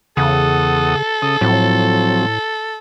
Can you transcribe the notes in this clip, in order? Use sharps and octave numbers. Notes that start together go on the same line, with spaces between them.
E2 C#3 A4 F#5 D#6
C#3 D#6
A2 F3 F#3 C4